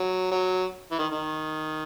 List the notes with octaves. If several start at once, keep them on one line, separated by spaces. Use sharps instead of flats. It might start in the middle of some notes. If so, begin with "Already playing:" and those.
Already playing: F#3
F#3
E3
D#3
D#3